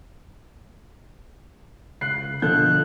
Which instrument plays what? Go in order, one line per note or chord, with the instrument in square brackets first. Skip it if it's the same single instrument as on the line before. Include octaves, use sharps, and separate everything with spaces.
[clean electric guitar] C#2 [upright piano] F#6 C7
[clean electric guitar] B2 D3 [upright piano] F3 A4 G6 [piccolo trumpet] F#6